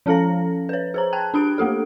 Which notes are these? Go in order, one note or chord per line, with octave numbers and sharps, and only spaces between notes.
F3 C#4 A4 F5 A#5 A#6
B4 C#5
G#4 C5 A#5
G5 A5 F#6 G#6
D4 G4 B5 F#6 D7
A3 A#3 G4 A4